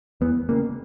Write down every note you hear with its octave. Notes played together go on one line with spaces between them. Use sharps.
E2 B3
C#3 A#3